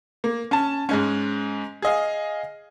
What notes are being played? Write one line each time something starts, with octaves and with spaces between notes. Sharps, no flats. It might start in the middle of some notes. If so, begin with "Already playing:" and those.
A#3
C#4 A5
G#2 G#3 C#4
G#4 D#5 F5